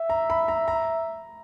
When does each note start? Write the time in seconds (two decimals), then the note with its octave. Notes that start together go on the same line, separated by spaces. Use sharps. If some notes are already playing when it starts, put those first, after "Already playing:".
Already playing: E5
0.10 A#5
0.30 B5
0.48 A#5
0.68 A#5